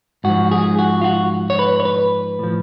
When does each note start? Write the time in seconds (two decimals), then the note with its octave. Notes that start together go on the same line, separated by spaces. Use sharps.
0.24 G#2 F3 F#4
0.51 G#4
0.79 F#4
1.02 F4
1.04 F#4
1.50 C#5
1.59 B4
1.80 C#5
1.85 B4
2.39 A2 F3